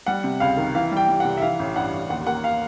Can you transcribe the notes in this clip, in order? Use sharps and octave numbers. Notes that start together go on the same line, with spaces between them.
G3 F#5
C3
C#2 F5
D#3
E3 F5
G3
G5
G3
F#5
C2
E5
E3 F5
A1
G2 F#5
A1
D#2 F#5
A#3 F#5
F5